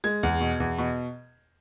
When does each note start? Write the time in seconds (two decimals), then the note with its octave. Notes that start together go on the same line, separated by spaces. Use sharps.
0.04 G#3 G#6
0.23 E2
0.41 B2
0.60 E2
0.78 B2